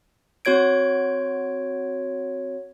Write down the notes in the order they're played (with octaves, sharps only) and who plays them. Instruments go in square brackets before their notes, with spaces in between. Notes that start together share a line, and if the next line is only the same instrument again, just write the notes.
[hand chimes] C4 F#4 C#5 G#6 D7